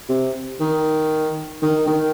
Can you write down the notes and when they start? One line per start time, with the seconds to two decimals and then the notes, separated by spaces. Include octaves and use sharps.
0.09 C3
0.60 D#3
1.62 D#3
1.87 D#3